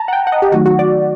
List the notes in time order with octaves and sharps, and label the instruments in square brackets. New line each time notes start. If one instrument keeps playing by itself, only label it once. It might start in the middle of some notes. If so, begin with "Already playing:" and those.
Already playing: [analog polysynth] A5 A#5
F#5
G5
F#5
D#5
G4
[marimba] D#3 F#3 A3 D#4 [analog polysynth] F#4
[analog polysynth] F#4
D5